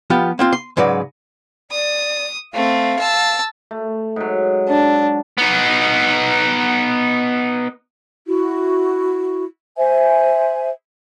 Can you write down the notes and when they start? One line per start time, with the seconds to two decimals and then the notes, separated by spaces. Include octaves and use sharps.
0.10 F3 B3 F4 G4
0.39 A#3 C4 F4
0.53 C6
0.77 G#2 C#3 F#3 B4 D5
1.71 D5 D#6
2.54 A3 C4 F5
2.99 A5 E6
3.71 A3
4.16 G#2 F#3
4.69 D4
5.38 B3 D#4
8.27 E4 F#4
9.77 C5 E5 G#5